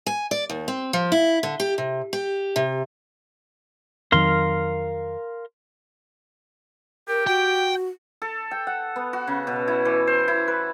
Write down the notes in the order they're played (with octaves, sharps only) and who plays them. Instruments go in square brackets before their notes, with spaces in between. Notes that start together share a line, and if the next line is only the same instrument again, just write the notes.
[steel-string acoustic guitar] G#5
D5
D#2
C4
F3
E4
D3
G4
C3
G4
C3
[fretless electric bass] F2 D#3 F#3 [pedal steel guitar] A#4 F5 C6
[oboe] G4 [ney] A#4
[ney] F#4 [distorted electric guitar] G5
[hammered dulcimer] A4
G5
F#5
B3
F#4
C#3
B2
E4
E3
C5
E4
B4